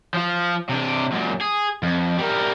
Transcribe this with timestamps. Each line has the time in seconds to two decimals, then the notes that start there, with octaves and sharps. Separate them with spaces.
0.14 F3 F4
0.69 C3 D4
1.12 F#2 A#2
1.41 G#4
1.83 F2
2.18 G3 A#4